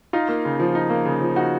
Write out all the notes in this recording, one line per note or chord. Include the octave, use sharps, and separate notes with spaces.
D#4 F4
A#3
C#3
F3
D#4
A#3
C#3
F3
D#4 F#4